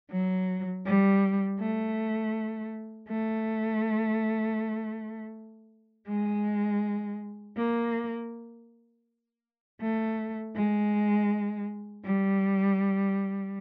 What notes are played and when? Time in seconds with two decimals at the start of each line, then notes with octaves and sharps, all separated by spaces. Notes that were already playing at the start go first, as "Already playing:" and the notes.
0.11 F#3
0.86 G3
1.60 A3
3.09 A3
6.08 G#3
7.57 A#3
9.81 A3
10.55 G#3
12.05 G3